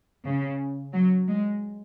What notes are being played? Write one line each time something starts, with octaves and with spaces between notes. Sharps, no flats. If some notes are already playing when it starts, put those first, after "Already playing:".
C#3
F#3
G#3